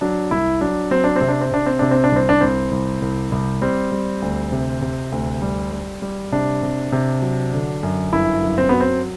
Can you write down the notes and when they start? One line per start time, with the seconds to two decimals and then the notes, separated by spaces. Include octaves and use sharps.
0.01 F#3 D4
0.31 C2 E4
0.61 F#3 D4
0.91 F#3 C4
1.04 D4
1.16 C4
1.21 C3
1.28 D4
1.41 C4
1.51 C3 D4
1.66 C4
1.79 C3 D4
1.91 C4
2.04 D4
2.12 C2 C4
2.29 D4
2.41 C2 C4
2.71 C2
3.02 C2
3.32 C2
3.62 G3 C4
3.92 G3
4.22 D2
4.52 C3
4.82 C3
5.12 D2
5.42 G3
5.72 G3
6.02 G3
6.32 C3 D4
6.62 C3
6.92 C3
7.22 F#3
7.53 D3
7.83 F#2
8.13 G1 E4
8.42 F#2
8.58 C4
8.69 F#3 B3
8.80 C4